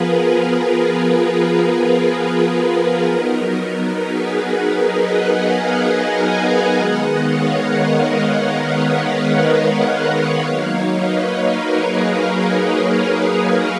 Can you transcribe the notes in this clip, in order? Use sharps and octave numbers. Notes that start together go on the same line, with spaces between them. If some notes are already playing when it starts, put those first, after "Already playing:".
Already playing: F3 B3 F4 G#4 A#4 B4
A#4
A#4
A#4
G#4 B4
F#3 B3 D#4 A#4
A#4
G#4 B4
D#5 F#5
F5 G#5
F#5 A#5
F5 G#5
D#3 G#3 B3 D#5 F#5
C#5 F5
A#4
C#5 F5
B4 D#5
D#5 F#5
F#3 A#3 D#4 C#5 F5
B4 D#5
A#4 C#5
G#4 B4
A#4